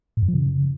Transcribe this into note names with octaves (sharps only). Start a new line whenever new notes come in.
A2
F#2
F3
C#3